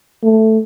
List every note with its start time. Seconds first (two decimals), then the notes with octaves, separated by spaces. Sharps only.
0.23 A3